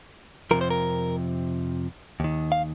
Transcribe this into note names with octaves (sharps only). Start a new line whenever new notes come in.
F2 C3 F3 A#4
C5
A#4
D#2 D#3
F5